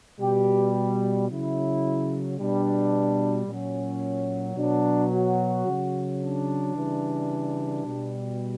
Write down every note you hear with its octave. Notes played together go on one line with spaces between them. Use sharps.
B2 G3 G4
C#3 F#3 E4
B2 G3 D4
A#2 F#3 C#4
B2 F#3 D4
F#4
C#3 F#3
D4
C#3 E3 G3
B2 G3